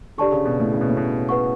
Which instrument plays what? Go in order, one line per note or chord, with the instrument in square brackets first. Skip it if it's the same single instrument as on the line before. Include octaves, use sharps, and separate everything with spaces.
[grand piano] D3 [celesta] G4 D5 A5 C#6
[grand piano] C#3
B2
A2
C#3
B2
A2
B2
[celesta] B4 F#5 C#6